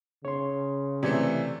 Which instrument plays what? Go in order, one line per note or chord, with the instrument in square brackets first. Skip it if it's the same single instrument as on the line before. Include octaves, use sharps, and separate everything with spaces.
[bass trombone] C#3 [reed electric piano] C#5 C6
[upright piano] C3 E3 A3 [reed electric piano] C4 D5 G#6